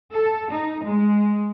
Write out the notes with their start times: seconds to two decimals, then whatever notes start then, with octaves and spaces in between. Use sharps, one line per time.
0.12 A4
0.50 D#4
0.84 G#3